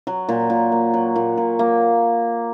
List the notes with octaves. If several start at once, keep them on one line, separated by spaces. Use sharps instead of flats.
F#3
A#2
A#2
A#3
F#3
A#2
A#2
A#3